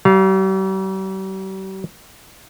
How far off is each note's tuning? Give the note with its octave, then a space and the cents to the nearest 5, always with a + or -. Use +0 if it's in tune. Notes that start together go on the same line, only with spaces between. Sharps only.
G3 -45 F5 +0